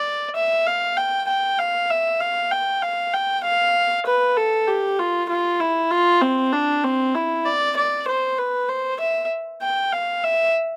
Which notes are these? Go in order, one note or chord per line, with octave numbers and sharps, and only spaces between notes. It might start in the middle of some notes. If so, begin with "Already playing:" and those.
Already playing: D5
E5
F5
G5
G5
F5
E5
F5
G5
F5
G5
F5
B4
A4
G4
F4
F4
E4
F4
C4
D4
C4
E4
D5
D5
C5
B4
C5
E5
G5
F5
E5